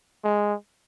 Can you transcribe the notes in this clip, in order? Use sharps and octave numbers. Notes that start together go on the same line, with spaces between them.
G#3